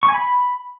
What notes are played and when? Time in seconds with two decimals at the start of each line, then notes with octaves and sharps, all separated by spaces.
0.03 C#6
0.08 G#5
0.14 B5